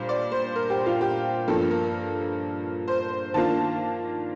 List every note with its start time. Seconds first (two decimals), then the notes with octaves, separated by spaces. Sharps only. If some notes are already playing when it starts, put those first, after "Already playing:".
Already playing: A#2 G3 D4 F4 C5
0.09 D5
0.32 C5
0.56 A#4
0.70 G4
0.86 F4
1.01 G4
1.48 G2 F3 A#3 A4
1.71 A#4
2.88 C5
3.34 D#3 A#3 D4 F4 A5